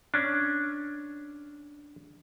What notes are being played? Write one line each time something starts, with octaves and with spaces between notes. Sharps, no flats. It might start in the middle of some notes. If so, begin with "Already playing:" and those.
C#4 D4